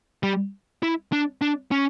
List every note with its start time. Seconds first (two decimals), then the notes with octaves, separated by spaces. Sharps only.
0.23 G3
0.83 E4
1.12 D4
1.41 D4
1.71 C#4